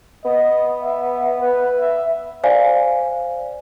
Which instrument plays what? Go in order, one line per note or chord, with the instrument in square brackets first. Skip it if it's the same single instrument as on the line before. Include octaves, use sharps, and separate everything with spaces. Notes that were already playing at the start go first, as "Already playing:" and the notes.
[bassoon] B3 [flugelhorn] D#5
[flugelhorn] E5
B4
E5
[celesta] C5 D5 F5 G#5